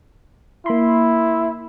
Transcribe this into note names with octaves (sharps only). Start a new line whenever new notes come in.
A#3 E4 B5 C6